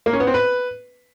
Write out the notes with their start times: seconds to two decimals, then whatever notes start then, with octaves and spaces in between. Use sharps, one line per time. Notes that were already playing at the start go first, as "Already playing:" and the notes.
0.06 A#3
0.13 C#4
0.20 B3
0.27 C4
0.34 B4